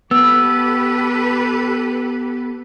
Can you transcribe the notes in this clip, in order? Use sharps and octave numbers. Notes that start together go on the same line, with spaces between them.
B3 G4 A4 B4 E6